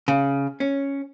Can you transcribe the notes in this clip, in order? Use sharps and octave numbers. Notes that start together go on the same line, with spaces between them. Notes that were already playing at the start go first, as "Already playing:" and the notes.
C#3
C#4